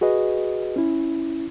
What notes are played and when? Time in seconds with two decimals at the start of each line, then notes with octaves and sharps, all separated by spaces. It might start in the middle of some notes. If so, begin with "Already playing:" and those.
0.01 F#4 G#4 B4 D#5
0.76 C#4 E4